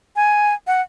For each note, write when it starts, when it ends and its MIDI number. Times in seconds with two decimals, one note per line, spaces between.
0.16 0.54 80
0.67 0.81 78